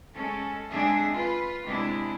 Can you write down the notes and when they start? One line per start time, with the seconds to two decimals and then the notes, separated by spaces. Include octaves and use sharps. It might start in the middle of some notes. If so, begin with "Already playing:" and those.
0.14 G#3 C#4 A4
0.69 G#3 C4 D4 G#4 E5
1.13 F4 B4
1.64 C3 G#3 D4 E4